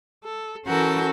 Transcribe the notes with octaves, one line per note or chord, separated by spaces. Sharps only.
A4
E3 C#4 F#4 A4 A#4 G6